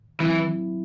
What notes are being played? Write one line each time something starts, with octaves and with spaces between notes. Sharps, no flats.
E3 F#3 C4 E4